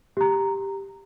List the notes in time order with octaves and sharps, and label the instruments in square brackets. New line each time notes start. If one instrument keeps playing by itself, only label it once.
[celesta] G4 A#5